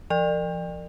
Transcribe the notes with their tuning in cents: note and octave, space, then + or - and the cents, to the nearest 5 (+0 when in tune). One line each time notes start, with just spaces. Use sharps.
F3 -30 D5 +35